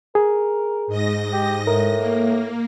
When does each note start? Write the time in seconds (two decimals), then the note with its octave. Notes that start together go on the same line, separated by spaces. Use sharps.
0.15 G#4 A#4
0.87 G#2 D#5 A#6
1.33 G4
1.67 A2 A#4
1.97 A#3